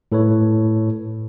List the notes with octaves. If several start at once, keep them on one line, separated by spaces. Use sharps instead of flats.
A2 A4 B4 C#5